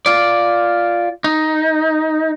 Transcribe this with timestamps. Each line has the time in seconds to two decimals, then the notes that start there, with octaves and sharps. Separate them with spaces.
0.06 F4 D5
1.24 D#4